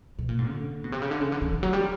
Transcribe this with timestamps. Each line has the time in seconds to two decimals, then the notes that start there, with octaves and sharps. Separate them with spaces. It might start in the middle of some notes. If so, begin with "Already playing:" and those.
0.19 B2
0.29 A#2
0.39 G#2
0.49 D3
0.84 B2
0.92 C3
1.02 C#3
1.11 D3
1.21 C#3
1.32 D3
1.42 D#3
1.53 D#3
1.63 F#3
1.73 G3